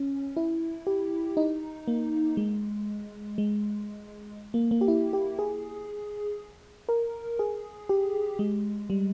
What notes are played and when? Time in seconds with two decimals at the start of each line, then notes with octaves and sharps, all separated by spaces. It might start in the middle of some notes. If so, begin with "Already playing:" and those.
Already playing: C#4
0.37 E4
0.87 G4
1.37 D#4
1.88 A#3
2.37 G#3
3.38 G#3
4.54 A#3
4.71 A#3
4.81 G4
4.88 E4
5.13 G4
5.39 G#4
6.89 A#4
7.39 G#4
7.89 G4
8.39 G#3
8.90 G3